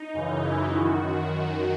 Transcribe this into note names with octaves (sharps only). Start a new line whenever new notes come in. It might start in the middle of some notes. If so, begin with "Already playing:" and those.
Already playing: D#4
F#2 C#3 E3
E4
F#2 D#3 F#4